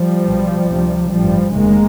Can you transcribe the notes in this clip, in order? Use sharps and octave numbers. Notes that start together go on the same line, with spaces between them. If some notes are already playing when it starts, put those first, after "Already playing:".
Already playing: F3 G3
B1 B2
D2 C3
A1 G2 F3 G3
F1 D#2 C#3 G#3 A#3